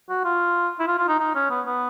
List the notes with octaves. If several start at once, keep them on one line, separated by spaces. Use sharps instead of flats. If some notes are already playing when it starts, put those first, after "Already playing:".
F#4
F4
E4
F4
F4
D#4
D#4
C#4
B3
B3